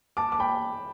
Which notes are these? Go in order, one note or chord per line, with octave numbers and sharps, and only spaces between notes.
A5 D6
D6
G5 B5